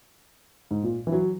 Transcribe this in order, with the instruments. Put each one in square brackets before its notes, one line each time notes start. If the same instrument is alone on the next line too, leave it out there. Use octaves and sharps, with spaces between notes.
[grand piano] G#2
A#2
E3
F#3